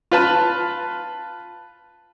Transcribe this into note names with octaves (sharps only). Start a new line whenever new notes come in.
F4 B4 A5